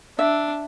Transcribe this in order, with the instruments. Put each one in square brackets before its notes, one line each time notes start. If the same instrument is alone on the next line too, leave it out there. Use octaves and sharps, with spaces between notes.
[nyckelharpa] D4 [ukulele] E5